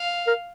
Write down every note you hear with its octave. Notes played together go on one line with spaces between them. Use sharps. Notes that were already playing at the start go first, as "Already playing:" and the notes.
Already playing: F5
A#4